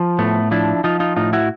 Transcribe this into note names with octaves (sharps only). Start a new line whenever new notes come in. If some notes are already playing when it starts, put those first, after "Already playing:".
Already playing: F3
A2 A3 B3
F3 D4 E4
F3 D#4 F4
D#4 F4
A2 D#4 F4
E4 F#4